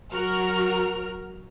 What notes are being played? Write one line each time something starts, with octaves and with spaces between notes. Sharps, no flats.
F#3 F#4 A#4 F6